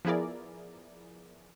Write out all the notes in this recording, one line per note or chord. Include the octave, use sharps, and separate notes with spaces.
F3 B3 E4 G#4 A#4 D5